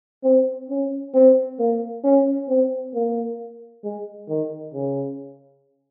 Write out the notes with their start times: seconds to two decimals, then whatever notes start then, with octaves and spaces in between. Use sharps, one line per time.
0.24 C4
0.69 C#4
1.15 C4
1.59 A#3
2.04 C#4
2.49 C4
2.94 A#3
3.84 G#3
4.29 D#3
4.74 C#3